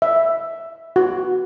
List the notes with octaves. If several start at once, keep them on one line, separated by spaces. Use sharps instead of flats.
E5
F#4